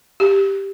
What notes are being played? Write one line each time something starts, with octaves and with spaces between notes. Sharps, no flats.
G4